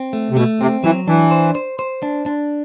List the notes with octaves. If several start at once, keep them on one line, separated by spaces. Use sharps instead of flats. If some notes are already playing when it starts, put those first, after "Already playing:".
Already playing: C4
A3
C3
B2 A3
C3 C4
E3 F#3
E3 D4
C5
C5
C5
D4
D4